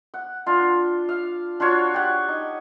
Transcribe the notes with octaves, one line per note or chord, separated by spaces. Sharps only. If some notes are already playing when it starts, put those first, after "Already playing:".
F#5
D4 F4
F5
D4 F4 F#4 C#5
G4 F#5
D#4